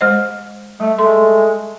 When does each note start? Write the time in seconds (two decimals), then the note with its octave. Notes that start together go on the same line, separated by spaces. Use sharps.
0.01 G#3 C5 D#5
0.80 G3 A3
0.98 G#3 A3 C6